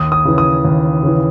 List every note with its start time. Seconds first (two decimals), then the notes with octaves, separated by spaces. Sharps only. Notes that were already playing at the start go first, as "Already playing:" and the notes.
Already playing: D#2 D#6
0.12 D#6
0.25 C#3 E3
0.38 D#6
0.65 D#2
1.03 C#3 E3